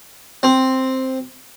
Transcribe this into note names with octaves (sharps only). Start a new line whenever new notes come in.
C4